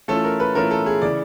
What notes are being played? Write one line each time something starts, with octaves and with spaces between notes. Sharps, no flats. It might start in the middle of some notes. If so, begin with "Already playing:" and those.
E3 A3 C#4 F4 A4
A#4
B4
E3 A3 C#4 F4 A#4
A4
G#4
C#3 E3 D5